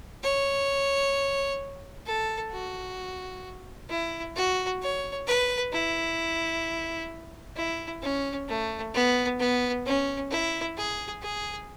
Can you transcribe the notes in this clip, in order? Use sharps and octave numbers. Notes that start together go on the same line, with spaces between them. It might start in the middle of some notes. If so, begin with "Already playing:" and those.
C#5
A4
F#4
E4
F#4
C#5
B4
E4
E4
C#4
A3
B3
B3
C#4
E4
G#4
G#4